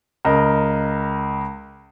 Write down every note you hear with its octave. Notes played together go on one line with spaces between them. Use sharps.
C#2 A#4 D#5